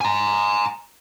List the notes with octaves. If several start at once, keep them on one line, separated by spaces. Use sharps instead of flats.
G#5 A#5